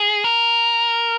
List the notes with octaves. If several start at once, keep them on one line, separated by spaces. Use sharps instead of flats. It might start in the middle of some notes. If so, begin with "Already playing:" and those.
Already playing: G#4
A#4